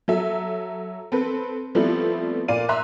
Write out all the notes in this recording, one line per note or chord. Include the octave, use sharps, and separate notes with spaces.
F#3 A4 E5
C4 A4 B4
F3 G3 A3 B3 C4 E4
A#2 D5 F5 D#7
E5 A#5 C6 F#6